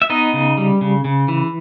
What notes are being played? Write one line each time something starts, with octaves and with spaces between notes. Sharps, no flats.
E5
B3 D#4 D#5
C#3
G3
C#3
C#3
E3